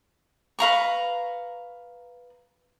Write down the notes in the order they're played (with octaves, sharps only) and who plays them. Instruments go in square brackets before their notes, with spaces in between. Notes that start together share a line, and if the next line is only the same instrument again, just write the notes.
[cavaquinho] B4 F5 A#5 C#6